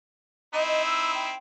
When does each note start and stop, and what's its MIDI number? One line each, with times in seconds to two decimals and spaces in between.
0.54 1.33 60
0.54 1.33 63
0.54 1.33 64
0.54 0.63 75
0.67 0.82 75
0.85 1.12 88
1.13 1.38 79